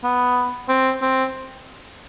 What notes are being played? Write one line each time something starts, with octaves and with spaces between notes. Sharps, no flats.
B3
C4
C4